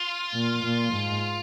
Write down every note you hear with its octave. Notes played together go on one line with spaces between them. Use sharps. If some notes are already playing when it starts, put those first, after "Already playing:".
Already playing: F4
A#2
A#2
G#2